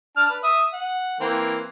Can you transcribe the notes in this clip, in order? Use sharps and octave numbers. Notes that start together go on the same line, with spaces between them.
D4 A5 F6
B4
E5 D#6
F#5
E3 A#3 C4